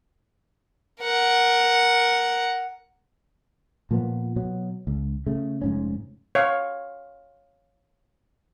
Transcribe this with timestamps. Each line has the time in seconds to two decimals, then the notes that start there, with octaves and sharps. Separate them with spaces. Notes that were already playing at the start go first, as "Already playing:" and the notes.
1.02 A#4 F#5
3.91 A#2 F3 A#3 B3
4.36 B2 F#3
4.87 C#2
5.26 C#3 A3
5.62 F1 G#2 C#4
6.35 C#5 F5